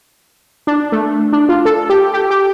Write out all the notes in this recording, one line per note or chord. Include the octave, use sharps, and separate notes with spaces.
D4
A3
D4
F4
A4
G4
G4
G4